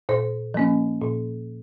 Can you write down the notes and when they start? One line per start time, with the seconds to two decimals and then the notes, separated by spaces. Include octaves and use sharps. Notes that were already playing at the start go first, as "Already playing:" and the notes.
0.09 A#2 C5
0.54 F3 A#3 C#4
1.01 A#2